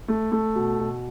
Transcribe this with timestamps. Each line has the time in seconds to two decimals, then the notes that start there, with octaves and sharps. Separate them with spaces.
0.08 A3
0.32 A3
0.55 B2
0.79 B2